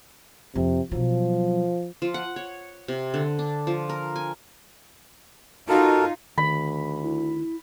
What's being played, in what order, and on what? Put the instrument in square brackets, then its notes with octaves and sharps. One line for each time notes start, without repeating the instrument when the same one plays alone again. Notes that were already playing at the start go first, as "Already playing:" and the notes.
[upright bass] F2 [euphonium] C3
[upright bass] B2 F#3 [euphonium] F3
[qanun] F3
F#5
C#5
C3
D3
D4
F3
A#4
G#5
[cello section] D#4 F4 [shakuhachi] F#4 [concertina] A4 A#4
[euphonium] D2 [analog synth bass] D#3 [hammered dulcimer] B5
[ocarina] E4